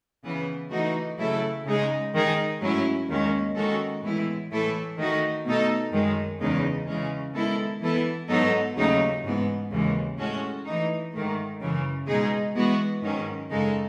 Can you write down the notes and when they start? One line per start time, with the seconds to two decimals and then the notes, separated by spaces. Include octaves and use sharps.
0.24 C#3 E3 B3
0.71 E3 A3 D#4 F#4
1.18 C#3 F#3 A3 E4 A4
1.65 C#3 G#3 D#4 G#4
2.13 D#3 G#3 D#4 G#4
2.60 G#2 F#3 A3 C#4 E4
3.08 D#2 D#3 G#3 C#4
3.55 D#3 G#3 C#4 F#4 A4
4.03 A2 E3 G#3 B3 E4
4.51 A2 E3 A3 E4 A4
4.97 D#3 A3 D#4 F#4
5.45 B2 A3 D#4 A4
5.92 F#2 D#3 G#3
6.40 E2 C#3 G#3 D#4
6.87 C#3 E3 G#3 C#4
7.34 D#3 G#3 B3 E4 A4
7.81 E3 B3 E4 A4
8.29 G#2 F#3 B3 D#4 A4
8.76 D#2 C#3 F#3 A3 D#4
9.23 G#2 E3 B3
9.71 D#2 C#3 E3 G#3
10.18 A2 G#3 C#4 F#4 A4
10.65 E3 A3 D#4
11.12 G#2 D#3 A3
11.60 F#2 C#3 E3
12.07 B2 G#3 D#4 G#4
12.55 E3 G#3 B3 F#4
13.02 G#2 D#3 F#3 C#4
13.50 F#2 C#3 G#3 D#4 A4